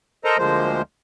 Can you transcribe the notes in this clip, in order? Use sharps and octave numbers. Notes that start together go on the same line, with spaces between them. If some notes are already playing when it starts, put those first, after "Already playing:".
A4 A#4 C5 D#5 A#5
D2 F3 G#3 A#3 C5